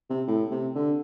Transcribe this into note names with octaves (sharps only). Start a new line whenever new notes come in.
C3
A2
C3
D3